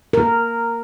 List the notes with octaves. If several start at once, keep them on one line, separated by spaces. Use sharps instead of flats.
A#4